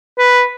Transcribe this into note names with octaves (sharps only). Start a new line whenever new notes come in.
B4